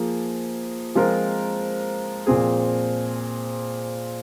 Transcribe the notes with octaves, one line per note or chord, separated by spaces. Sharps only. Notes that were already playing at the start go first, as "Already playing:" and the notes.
Already playing: F3 A#3 G#4
F3 G#3 C4 F4 A#4
A#2 F3 C4 G#4